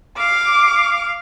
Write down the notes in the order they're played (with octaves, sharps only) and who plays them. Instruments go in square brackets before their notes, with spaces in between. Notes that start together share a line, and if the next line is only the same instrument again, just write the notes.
[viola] F5 [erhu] D6